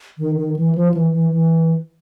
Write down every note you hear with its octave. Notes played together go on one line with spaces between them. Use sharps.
D#3
D#3
E3
F3
E3
E3
E3